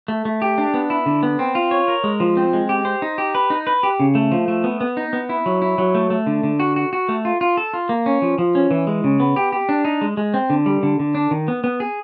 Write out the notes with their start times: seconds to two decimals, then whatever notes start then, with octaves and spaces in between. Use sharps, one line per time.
0.08 A3
0.25 A3
0.42 G4
0.58 D4
0.74 B3
0.90 E4
1.06 D3
1.23 B3
1.39 C4
1.55 F4
1.71 C#5
1.88 A#4
2.04 G#3
2.20 F3
2.37 C4
2.53 G#3
2.69 G4
2.85 C5
3.02 D#4
3.18 G4
3.35 B4
3.50 D#4
3.67 B4
3.83 G4
4.00 C#3
4.15 A3
4.32 F3
4.48 A3
4.64 B3
4.81 B3
4.97 D#4
5.13 B3
5.29 E4
5.46 F#3
5.62 E4
5.78 F#3
5.95 A3
6.10 A3
6.27 D3
6.43 D3
6.60 F#4
6.76 F#4
6.93 F#4
7.09 A3
7.25 F4
7.41 F4
7.57 A4
7.73 F4
7.89 A#3
8.06 C#4
8.22 F3
8.38 F3
8.55 C#4
8.71 E3
8.87 G#3
9.04 C#3
9.20 B3
9.36 G4
9.52 G4
9.69 D4
9.85 D#4
10.01 G#3
10.17 G#3
10.34 C4
10.50 D3
10.66 G3
10.83 D3
10.99 D3
11.15 D4
11.31 D#3
11.48 B3
11.64 B3
11.80 G#4